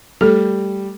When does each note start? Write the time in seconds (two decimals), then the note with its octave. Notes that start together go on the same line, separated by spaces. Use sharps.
0.21 G3 A3 A4